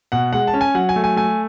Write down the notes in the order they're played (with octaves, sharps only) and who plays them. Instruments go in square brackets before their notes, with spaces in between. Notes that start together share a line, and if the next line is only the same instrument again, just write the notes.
[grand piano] B2 F#5
G#3 F#5
A5
C#4
G#5
F#3 F#5
G#5
A3
G#5
A3 G#5